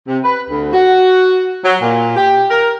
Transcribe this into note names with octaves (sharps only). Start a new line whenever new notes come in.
C3
B4
D2
F#4
F#3
A#2
G4
A#4